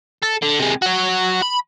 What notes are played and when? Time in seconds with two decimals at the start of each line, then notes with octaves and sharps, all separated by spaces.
0.22 A4
0.42 D3
0.59 C3 G#3
0.82 F#4 C#5
1.42 B5